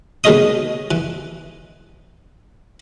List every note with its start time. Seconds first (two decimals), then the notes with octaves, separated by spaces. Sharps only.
0.24 B2 D#3 G#3 C#5 D#5 D#6
0.91 E3